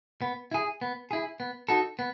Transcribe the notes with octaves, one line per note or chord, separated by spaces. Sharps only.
B3
E4 G#4
B3
E4 G#4
B3
D#4 F#4 A4
B3